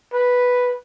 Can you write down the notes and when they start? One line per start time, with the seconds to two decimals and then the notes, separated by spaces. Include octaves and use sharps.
0.13 B4